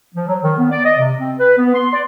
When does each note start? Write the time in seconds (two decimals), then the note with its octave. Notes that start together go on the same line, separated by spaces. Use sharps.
0.15 F3
0.27 F#3
0.43 D#3
0.58 B3
0.70 D5
0.84 D#5
0.98 C3
1.18 C4
1.38 B4
1.57 B3
1.74 C6
1.93 D5